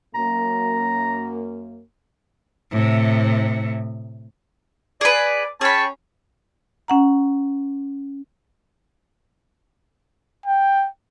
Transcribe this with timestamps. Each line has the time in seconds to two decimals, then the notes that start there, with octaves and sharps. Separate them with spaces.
0.15 F#2 A#3 A#5
2.71 A2 C3
5.01 G#4 B4 D5
5.61 C#4 G#4 G5 A5 B5 C#6
6.88 C#4 F#5 A#5
10.46 G5